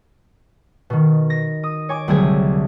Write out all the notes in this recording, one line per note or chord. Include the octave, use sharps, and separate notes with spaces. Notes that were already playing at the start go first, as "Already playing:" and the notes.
B2 D#3
A#6
D#6
C#5 G#5 D6
C2 D3 F#3 A3 G#4 G#5